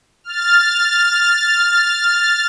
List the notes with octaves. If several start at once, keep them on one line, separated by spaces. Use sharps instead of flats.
F6 A6